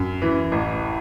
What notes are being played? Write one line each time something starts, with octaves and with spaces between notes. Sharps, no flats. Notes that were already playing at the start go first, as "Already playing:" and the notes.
Already playing: F#2
E3
A1